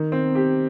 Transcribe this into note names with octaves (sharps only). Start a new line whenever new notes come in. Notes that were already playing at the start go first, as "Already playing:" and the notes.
Already playing: D#3
C4
G4